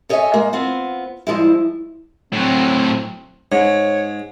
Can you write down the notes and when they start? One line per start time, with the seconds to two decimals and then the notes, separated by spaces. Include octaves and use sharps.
0.09 A4 C#5 D#5 E5 F#5 G#5
0.34 G#3 A#3
0.53 B3 C4 F4
1.27 G2 F3 G#3 E4
2.33 A2 F#3 C4
3.52 G#2 C#5